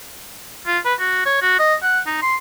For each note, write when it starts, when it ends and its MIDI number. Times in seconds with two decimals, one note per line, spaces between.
0.66 0.78 65
0.85 0.94 71
0.99 1.24 66
1.26 1.39 73
1.42 1.56 66
1.59 1.75 75
1.83 2.00 78
2.07 2.21 63
2.22 2.36 84